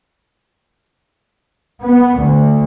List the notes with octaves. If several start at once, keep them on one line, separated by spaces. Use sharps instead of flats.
B3
D2